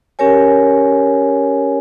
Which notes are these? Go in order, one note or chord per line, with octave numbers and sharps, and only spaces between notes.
C#4 G4 A#4 C#5 G#5